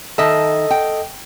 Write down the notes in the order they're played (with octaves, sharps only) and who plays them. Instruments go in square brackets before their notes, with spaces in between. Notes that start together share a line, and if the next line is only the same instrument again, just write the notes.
[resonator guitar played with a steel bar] D#3 E5 A5 [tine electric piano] A4 D#5
[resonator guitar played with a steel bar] G5